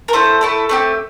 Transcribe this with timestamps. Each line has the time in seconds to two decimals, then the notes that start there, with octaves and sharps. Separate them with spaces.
0.08 A#4
0.13 A3 E4 A4 C5
0.41 A3 E4 A4
0.69 A3 C4 G4